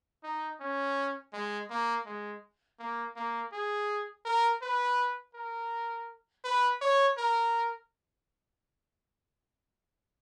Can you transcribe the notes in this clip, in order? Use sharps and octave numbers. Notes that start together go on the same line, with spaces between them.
D#4
C#4
G#3
A#3
G#3
A#3
A#3
G#4
A#4
B4
A#4
B4
C#5
A#4